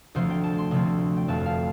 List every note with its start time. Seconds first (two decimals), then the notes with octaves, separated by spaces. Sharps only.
0.15 D2 C3 F3 A3 C4 C5
0.30 G5
0.44 A5
0.58 C6
0.71 D2 C3 F3 A3 C4
1.17 G5
1.28 F1 F2 F3 A3 C4 A5
1.46 F5